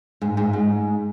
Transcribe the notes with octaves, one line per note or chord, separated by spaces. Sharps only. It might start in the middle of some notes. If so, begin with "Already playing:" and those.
G#2
G#2
G#2